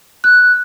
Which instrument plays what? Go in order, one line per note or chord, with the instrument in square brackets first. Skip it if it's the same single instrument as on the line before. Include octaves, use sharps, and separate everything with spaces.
[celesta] F#6